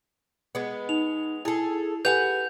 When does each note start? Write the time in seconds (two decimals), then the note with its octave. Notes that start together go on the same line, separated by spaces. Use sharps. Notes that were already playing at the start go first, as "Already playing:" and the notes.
0.55 G#3 B3
0.89 D#4 F7
1.45 E4 G#4 A4
2.05 G4 A4 B4 F#5 G#5 G6 F7